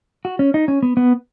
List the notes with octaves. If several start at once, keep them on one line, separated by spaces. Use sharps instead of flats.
F#4
C#4
D#4
C#4
B3
B3